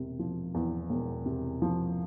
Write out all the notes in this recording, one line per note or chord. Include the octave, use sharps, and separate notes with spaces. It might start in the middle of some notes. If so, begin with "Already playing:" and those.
Already playing: E1 C3
F3
E2
E1
C3
F3